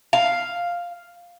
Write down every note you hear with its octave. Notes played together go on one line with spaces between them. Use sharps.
F5